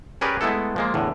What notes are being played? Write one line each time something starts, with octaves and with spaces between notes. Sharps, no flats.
C#4 G4 G#4 A#4 B4 D5
G#3 A3 B3 E4 A4
F3 G#3 A#3
E2 A2 D3